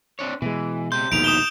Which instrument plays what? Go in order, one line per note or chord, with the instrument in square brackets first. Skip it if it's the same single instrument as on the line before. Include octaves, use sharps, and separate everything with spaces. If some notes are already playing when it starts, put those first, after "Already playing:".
[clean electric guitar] C4 D4 C#5
[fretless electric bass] B2 G#3 [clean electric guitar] E3
[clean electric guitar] C#2 C3 C6 [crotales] G6
[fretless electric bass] A#1 D#2 B2 [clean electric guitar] D#4 E4 G#4 [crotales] D7 F7
[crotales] D#6 E7 G7